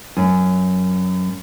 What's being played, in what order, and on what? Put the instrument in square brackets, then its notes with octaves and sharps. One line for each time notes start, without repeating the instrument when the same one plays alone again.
[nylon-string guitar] F#2